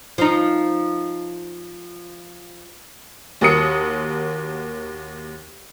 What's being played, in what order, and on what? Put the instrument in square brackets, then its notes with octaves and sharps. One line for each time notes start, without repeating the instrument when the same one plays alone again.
[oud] F3 D#4
[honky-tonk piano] D#2 F#4 A#4 D#6 C#7